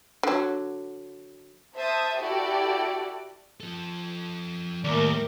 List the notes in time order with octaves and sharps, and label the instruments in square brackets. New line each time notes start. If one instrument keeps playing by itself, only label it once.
[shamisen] D3 F#3
[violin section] C5 E5 A5 D#6
E4 F#4 G4 A4 D5
[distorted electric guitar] F3 A4
[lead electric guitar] D#2 [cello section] A2 A#4 [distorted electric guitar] G3 [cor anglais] D5